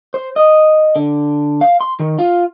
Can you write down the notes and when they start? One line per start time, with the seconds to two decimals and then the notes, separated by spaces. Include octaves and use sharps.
0.14 C5
0.36 D#5
0.96 D3
1.61 F5
1.81 C6
2.00 D#3
2.19 F4